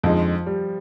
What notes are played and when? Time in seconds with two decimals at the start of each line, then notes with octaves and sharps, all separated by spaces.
0.03 F2 D3 F3 G#3 D#4
0.46 G3